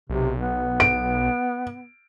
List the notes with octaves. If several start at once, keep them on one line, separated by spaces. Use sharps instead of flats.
B1 C3
B3
D7